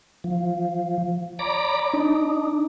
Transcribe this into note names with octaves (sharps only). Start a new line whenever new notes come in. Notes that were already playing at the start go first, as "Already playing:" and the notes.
F3
C#5 D5 A#5 B5 D6
D4 D#4